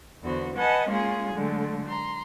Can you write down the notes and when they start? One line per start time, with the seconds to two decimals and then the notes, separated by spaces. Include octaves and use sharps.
0.22 E2 D3 B3 F#4 C5
0.55 B4 D#5 F#5 G#5 A5
0.89 G#3 A#3 C#4 F4 G#4
1.33 D3 F#3 G#3 A3
1.87 A#5 C6